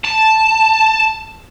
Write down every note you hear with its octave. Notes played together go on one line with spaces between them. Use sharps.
A5